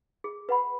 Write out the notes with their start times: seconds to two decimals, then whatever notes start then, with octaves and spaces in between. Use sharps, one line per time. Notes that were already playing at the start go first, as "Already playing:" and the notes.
0.24 G#4
0.49 B4 F#5 B5